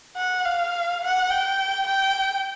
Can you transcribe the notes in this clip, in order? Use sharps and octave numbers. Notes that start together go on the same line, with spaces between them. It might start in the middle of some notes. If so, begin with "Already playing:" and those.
F#5
F5
F#5
G5
G5